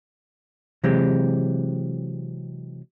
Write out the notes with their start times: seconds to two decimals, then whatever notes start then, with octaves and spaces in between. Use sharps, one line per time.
0.83 C3 E3 F#3 G#3 C4 G4